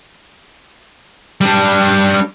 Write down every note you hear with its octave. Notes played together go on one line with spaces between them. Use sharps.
G3 D4